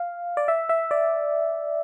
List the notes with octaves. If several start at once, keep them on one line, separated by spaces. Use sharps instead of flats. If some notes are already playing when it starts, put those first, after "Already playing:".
Already playing: F5
D5
E5
E5
D5